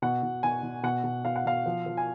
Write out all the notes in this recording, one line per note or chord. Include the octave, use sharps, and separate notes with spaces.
B2 F#5
B2
B2 G#5
B2
B2 F#5
B2
B2 F5
F#5
B2 F5
F3
F3
G#5